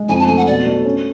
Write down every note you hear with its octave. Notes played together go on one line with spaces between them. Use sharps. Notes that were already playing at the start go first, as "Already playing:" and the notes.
Already playing: G#3
F2 G#5
A5
A3 G#5
F#5
B2 D5
A3
C#4